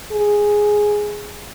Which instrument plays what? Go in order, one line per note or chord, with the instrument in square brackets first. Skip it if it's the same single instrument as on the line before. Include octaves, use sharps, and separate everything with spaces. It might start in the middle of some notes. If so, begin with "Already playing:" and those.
[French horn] G#4